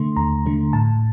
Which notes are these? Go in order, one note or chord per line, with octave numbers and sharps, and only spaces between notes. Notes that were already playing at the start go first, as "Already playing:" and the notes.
Already playing: D3 A3 C6
D#2 A#5
D3 A3
A2 A5